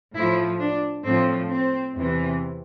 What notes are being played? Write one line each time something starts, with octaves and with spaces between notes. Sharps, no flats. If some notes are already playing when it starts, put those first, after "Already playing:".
A2 F3 E4
D4
A2 F3 C4
C4
E2 C3 E3